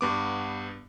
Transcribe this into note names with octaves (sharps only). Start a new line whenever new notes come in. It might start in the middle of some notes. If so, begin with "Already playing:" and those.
G2 B3 D6